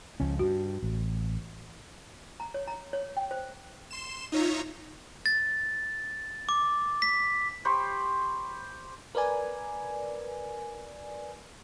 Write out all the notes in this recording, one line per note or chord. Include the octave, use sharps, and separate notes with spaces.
C#2 F3 C#4
G2 F#4
A1
A#5
C#5
A#5
C#5
G5
C5
C6 E7
D#4 F4 C#5 E5 A#5
A6
D6
B6
G4 C5 B5 C#6
A#4 B4 D5 G#5